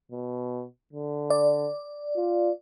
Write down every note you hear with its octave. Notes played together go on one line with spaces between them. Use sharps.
B2
D3
D5
F4